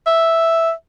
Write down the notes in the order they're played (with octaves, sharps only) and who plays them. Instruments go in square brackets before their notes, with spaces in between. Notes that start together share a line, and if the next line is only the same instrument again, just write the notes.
[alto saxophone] E5